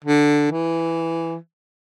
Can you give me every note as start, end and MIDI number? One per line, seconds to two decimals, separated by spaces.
0.04 0.49 50
0.52 1.36 52